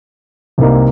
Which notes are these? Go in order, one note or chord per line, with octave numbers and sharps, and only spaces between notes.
C2 C3 G3 A#3 D#4